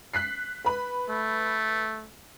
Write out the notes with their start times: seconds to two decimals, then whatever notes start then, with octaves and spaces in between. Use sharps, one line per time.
0.14 F#6 B6 C7
0.65 B4 B5
1.09 A3